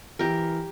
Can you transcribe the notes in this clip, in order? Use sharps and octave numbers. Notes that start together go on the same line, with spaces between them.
E3 G4 A#4